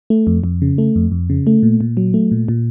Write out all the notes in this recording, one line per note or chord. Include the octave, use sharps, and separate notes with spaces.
A3
F2
F2
C#3
A3
F2
F2
C#3
A3
A#2
A#2
F#3
A3
A#2
A#2